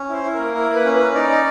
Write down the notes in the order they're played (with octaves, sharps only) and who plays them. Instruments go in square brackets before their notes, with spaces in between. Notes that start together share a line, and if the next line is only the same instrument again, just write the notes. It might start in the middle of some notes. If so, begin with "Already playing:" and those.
Already playing: [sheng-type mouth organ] C#4
E4 C5
E4
A#3 A#4
E4 A#4
A#3
B4
C#4
B4
C#4
D#4 D5
D#4